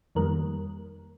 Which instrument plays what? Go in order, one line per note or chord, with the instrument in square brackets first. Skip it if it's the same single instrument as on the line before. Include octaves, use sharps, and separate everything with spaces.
[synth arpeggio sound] F2 D#3 G3 A#3 A#4